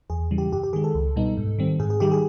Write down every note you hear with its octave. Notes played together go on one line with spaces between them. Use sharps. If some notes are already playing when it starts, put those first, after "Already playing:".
E2 G#4
C#3 E3 G3
G4
G2 G4
G4
D#3 G#3 G#4
A4
C#2
B2 G3 B3 D#4
G#2
D#3 G3 C4
G#2 G#4
G#4
D#3 G3 G4
G#4